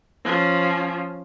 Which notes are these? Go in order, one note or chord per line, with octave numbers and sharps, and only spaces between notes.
F3 C#4